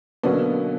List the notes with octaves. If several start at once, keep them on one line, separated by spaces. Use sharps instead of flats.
B2 D3 F#3 A#3 B3 C#4